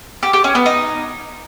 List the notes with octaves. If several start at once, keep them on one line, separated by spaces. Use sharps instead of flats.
G4
G4
C#4
B3
D#4